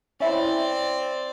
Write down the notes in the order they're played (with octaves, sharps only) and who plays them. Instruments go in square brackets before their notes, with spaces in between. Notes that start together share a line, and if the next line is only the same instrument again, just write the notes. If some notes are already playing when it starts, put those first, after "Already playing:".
[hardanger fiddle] C4 D5 [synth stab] C#4 E4